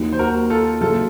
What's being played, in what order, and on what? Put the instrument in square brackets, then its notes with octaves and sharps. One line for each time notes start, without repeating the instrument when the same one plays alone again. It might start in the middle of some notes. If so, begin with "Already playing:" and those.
Already playing: [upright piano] D#2 D#3 F#3
[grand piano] C5
F#4 A#4
F4 A4
[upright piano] F#1 F#2 C#3 [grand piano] F4 A4